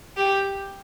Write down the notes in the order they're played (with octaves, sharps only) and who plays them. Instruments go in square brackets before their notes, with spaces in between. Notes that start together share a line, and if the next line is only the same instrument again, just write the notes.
[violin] G4